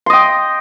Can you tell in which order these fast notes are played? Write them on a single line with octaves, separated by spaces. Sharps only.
C6 D#5 G5